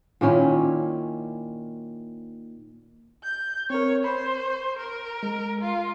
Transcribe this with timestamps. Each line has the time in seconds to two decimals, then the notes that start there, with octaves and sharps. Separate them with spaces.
0.21 A#2 D#3 C#4 E4
3.24 G6
3.70 C4 A#4 C#5
4.04 C5 B5 C#6
4.79 A#4
5.23 G#3
5.61 F4